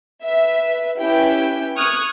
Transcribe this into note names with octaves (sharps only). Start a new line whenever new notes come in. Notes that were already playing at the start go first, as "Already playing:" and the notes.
B4 E5
C#4 E4 G4 B4 G5
C#6 D#6 F6 F#6 G#6